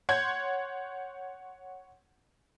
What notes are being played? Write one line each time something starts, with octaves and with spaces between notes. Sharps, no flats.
C#5 F#5 C6 G6 G#6